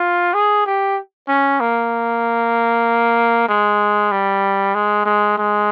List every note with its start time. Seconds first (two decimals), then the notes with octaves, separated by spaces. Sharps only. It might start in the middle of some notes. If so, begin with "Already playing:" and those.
Already playing: F4
0.34 G#4
0.66 G4
1.28 C#4
1.60 A#3
3.48 G#3
4.11 G3
4.75 G#3
5.05 G#3
5.38 G#3